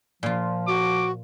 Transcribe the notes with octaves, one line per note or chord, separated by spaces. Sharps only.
A#2 F3 F4
F#4 D6